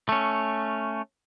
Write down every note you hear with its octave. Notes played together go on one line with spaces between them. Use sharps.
A3 C#4